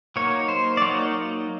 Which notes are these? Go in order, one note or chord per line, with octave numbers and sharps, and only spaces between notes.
F#3 A#3 D#4 C#5
C5
D5
F#3 A#3 D#4 C#5